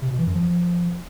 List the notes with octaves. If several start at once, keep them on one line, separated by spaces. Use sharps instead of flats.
C3
B2
E3
F#2
F3